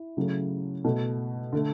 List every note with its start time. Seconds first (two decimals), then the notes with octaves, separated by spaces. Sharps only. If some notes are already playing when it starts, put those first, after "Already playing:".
Already playing: E4
0.17 C#3 F#3 A3
0.84 B2 A3
1.53 D3 A3